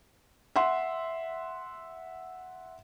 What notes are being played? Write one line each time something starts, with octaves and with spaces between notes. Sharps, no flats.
E5 F#5 C6